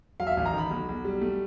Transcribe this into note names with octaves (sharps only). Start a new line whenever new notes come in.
F#3 F5
E5
F5
A1
A#5
D#3 B5
B1
B1
G3
A3